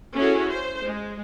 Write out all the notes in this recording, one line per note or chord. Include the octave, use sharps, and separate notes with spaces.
C#4 E4 F#4 G#4 A4
C5
G#3